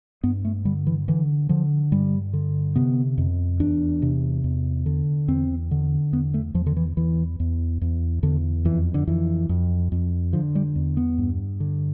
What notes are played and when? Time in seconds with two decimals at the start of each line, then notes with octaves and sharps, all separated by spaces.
0.23 G2 B3
0.45 A3
0.65 D3 G3
0.87 E3
1.08 D3 E3
1.49 D3 F3
1.91 G2 G3
2.33 D3
2.76 C3 B3
3.18 F2
3.60 E2 D4
4.02 C3
4.44 E2
4.86 D3
5.28 E2 C4
5.71 D3
6.12 E2 B3
6.34 A3
6.54 E2 F3
6.66 D3
6.77 E3
6.97 E2 E3
7.40 E2
7.81 E2
8.23 E2 D3
8.65 F2 E3
8.94 D3
9.07 F2 E3
9.49 F2
9.92 F2
10.33 D3 F3
10.55 G3
10.76 E2
10.97 B3
11.18 G2
11.60 D3